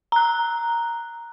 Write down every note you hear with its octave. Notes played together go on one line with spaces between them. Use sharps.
A#5 F#6